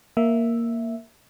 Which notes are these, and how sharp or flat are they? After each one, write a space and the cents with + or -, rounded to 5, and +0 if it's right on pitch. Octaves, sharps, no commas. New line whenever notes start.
A#3 +0 E5 +0